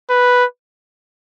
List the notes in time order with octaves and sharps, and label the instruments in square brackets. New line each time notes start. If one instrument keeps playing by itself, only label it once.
[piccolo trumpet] B4